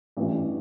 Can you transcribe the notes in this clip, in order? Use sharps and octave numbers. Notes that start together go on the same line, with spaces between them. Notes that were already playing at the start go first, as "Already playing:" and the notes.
A1 G2 E3 G3